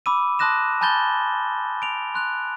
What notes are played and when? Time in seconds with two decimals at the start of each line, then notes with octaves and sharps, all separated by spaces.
0.06 B5 D6 E6 D#7
0.39 A5 C6 D#6 F#6 A#6 E7
0.81 G#5 A5 B5 G6 A6 G7
1.82 D7 F7
2.14 C6 F#6 F7